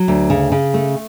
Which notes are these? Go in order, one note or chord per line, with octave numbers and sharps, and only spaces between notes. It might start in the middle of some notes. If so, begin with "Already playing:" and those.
Already playing: F#3
D2
C#3
C#3
A3